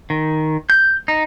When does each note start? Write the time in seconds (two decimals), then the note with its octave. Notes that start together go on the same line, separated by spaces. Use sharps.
0.10 D#3
0.70 G6
1.08 D#4